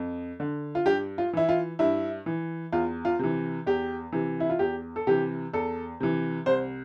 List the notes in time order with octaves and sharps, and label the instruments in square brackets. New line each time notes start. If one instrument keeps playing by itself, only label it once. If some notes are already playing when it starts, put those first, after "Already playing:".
Already playing: [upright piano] F2
D3
F4
G2 G4
F4
E3 E4
F4
G2 E4
E3
E2 F4
F4
C3 E3
E2 G4
C3 E3
E4
F4
E2 G4
A4
C3 E3 G4
E2 A4
C3 E3
C2 C5